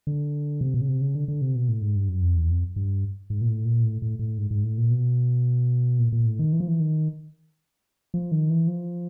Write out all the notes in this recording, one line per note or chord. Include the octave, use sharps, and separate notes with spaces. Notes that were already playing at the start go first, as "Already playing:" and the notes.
D3
C3
B2
C#3
C3
C#3
D3
D3
C3
B2
A2
G#2
G2
F#2
F2
E2
F2
G2
G#2
A#2
A2
A#2
A2
A2
A2
G#2
G#2
A2
A#2
B2
A#2
A#2
A2
D#3
E3
F3
E3
D#3
F3
D#3
E3
F3